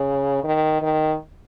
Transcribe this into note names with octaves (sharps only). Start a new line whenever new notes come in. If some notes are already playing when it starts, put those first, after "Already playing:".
Already playing: C#3
D#3
D#3